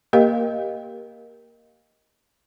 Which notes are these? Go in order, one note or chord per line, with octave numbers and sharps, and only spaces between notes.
A#3 G4 A#4 D#5 F5